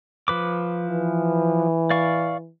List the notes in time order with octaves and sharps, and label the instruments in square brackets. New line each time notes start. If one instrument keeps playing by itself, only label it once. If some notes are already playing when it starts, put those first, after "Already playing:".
[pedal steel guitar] F3 B4 D6
[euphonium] E3
[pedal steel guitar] D5 F5 C#6